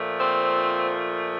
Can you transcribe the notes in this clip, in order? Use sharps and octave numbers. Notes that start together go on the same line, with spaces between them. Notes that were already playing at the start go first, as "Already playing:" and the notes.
Already playing: A#2 F3 A3
C4